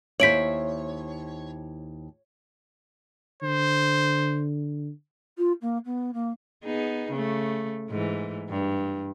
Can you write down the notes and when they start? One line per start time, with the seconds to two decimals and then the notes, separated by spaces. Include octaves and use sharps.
0.20 D#2 E4 C5 C#5 B6 D7 F#7
3.43 D3 C5
5.38 F4
5.61 A#3
5.85 B3
6.13 A#3
6.64 B3 D#4 G#4
7.12 C#3 A3
7.90 G#2 E3
8.50 G2